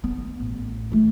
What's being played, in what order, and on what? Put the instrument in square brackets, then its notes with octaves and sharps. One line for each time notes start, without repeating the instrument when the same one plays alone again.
[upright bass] B3
A1
A3 F4